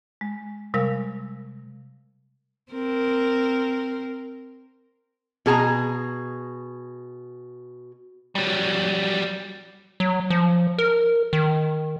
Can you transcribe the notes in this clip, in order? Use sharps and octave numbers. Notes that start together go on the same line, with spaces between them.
G#3
C3 G3 G#3 A#4 F5 E6
C4 A#4
B2 G#4 A5 A#5
F#3 G3
F#3
F3
A#4
D#3